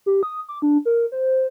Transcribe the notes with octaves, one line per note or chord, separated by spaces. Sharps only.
G4
D#6
D6
D4
A#4
C5